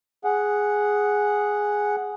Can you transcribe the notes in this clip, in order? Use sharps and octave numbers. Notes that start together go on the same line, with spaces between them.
G#4 F#5